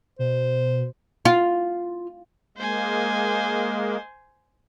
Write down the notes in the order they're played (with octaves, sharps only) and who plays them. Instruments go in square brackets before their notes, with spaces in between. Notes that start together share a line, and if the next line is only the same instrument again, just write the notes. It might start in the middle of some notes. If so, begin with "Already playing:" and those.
[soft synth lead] B2 [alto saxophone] C5
[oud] F4
[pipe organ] G#3 A#3 [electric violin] C5 G#5